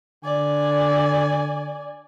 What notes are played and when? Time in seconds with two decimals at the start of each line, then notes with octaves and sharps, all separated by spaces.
0.24 D3 D5 G#5